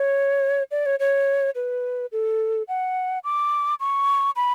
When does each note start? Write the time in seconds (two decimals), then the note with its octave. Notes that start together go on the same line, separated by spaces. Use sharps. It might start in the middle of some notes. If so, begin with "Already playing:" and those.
Already playing: C#5
0.71 D5
0.86 C#5
1.00 C#5
1.56 B4
2.12 A4
2.68 F#5
3.24 D6
3.80 C#6
4.36 B5